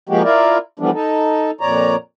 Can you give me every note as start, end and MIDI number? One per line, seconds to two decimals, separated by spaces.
0.09 0.22 53
0.09 0.22 56
0.09 0.22 58
0.09 0.22 66
0.09 0.22 67
0.23 0.58 64
0.23 0.58 65
0.23 0.58 70
0.23 0.58 74
0.79 0.91 52
0.79 0.91 53
0.79 0.91 55
0.79 0.91 57
0.79 0.91 59
0.79 0.91 62
0.94 1.51 63
0.94 1.51 69
1.61 1.96 41
1.61 1.96 46
1.61 1.96 73
1.61 1.96 74
1.61 1.96 82